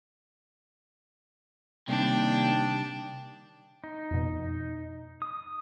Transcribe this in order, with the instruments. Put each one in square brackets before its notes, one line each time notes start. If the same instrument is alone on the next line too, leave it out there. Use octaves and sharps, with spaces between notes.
[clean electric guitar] C3 G3 [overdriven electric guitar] D#3 A#3 [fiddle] D4 [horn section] G5
[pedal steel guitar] D#4
[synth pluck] F2 B2
[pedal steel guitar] D#6